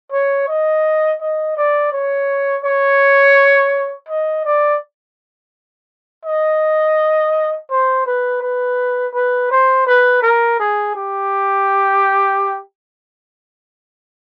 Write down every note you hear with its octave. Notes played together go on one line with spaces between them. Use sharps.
C#5
D#5
D#5
D5
C#5
C#5
D#5
D5
D#5
C5
B4
B4
B4
C5
B4
A#4
G#4
G4